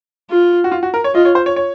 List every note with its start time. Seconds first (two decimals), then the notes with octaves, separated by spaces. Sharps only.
0.30 F4
0.64 F#4
0.72 F4
0.83 F#4
0.94 A#4
1.04 C#5
1.14 F4 D#5
1.25 C#5
1.35 C5
1.46 C#5
1.56 C#5